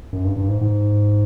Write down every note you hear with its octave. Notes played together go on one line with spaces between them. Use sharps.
F#2
G2
G2
G#2
G#2